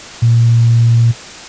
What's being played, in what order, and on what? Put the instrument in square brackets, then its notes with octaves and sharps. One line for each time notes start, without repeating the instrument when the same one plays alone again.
[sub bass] A#2